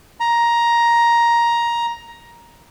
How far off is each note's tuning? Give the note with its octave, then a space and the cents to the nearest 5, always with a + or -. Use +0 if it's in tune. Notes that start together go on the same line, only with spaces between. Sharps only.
A#5 +10